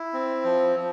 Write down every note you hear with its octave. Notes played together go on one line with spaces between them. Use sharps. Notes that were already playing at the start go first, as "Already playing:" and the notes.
Already playing: E4
C4
F3
F3